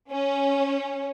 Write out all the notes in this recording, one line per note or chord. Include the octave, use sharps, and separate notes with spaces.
C#4